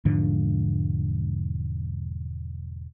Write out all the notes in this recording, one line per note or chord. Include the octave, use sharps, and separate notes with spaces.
E1 G#2 D3 F3